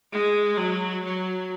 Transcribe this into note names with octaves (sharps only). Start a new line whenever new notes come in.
G#3
F#3
F#3